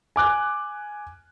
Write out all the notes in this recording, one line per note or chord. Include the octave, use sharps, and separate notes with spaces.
G#5 D6 F#6